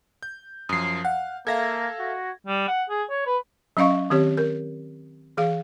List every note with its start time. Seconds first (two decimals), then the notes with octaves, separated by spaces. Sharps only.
0.23 G6
0.69 F#2 F3 D#6 C7
1.05 F5 F#5
1.47 A#3 A4 E5 F5 G#6 A#6
1.99 F#4
2.47 G3
2.68 F#5
2.90 G#4
3.10 C#5
3.26 B4
3.77 F#3 C#4 D#5 F5 C#6
4.10 D#3 C4 G4 C#5
4.37 A#4
5.37 E3 G#4 F5